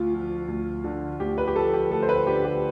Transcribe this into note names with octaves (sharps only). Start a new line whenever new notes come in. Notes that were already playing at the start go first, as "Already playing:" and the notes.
Already playing: D2 F4
F3
D2
D3
D2 G4
B4
G4
F3 A4
G4
D2 A4
C5
B4
D3 G4
G4